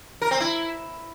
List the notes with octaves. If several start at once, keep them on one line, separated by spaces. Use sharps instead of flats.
A#4
C4
E4